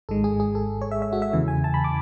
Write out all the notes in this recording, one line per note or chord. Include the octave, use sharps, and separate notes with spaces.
G#1 G#2 G#3 A4
G#4
G#4
A4
C#5
E5
E5
F#4
E5
E2 C#3 E3
G#5
A5
B5
D6